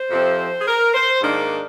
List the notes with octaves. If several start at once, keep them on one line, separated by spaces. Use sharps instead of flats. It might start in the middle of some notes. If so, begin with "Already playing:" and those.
Already playing: C5
F2 C3 F3 C4
G#4
A#4
C5
G#2 D#3 A#3 D4